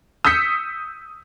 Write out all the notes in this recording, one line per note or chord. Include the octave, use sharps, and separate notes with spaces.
D#6 E6 G6 B6 C#7